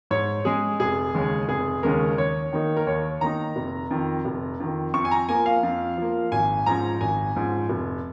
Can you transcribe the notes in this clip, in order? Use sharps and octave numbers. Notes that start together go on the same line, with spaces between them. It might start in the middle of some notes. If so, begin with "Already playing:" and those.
G#2 C#5
G#3 C#4 G#4
F1 G#4
D#2 C#3 G#3 C#4
F1 G#4
D#2 C#3 G#3 C#4 A#4
D#2 C#5
D#3 A#3 D#4
A#4
D#2 C#5
D#3 A#3 D#4 A#5
F1
F2 D#3
F1
F2 D#3
F2 C#6
G#5
A#5
F3 A#3 G#5
F5
F2
F3 A#3
G#1 G#5
G#2 F3 C#4 A#5
G#1 G#5
G#2 F3 C#4
F1